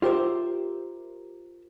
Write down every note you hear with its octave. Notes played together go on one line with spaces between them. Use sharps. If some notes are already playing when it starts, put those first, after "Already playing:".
F4 G4 A#4 C5 E5